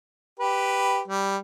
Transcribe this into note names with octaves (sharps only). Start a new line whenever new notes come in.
G4 B4
G3